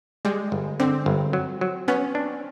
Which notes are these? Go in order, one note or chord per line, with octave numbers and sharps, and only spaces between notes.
G3 G#3
G1
D3 C4
G1
F#3
F#3
B3 C#4
D4